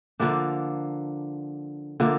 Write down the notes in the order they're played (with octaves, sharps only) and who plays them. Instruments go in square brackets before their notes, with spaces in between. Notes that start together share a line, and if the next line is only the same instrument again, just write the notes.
[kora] D3 F3 A#3 D4
D3 F3 A#3